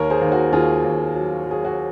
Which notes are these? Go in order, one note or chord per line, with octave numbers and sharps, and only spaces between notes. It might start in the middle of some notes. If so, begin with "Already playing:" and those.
Already playing: D#2 A#4 C#5
G#4 C5
D#2
F#4 A#4
D#2 F4 G#4
D#2
F#3
F#3 G#4
F#4